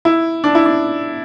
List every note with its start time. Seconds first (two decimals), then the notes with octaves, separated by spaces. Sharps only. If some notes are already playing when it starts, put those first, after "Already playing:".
0.05 E4
0.44 D4
0.55 E4
0.65 D4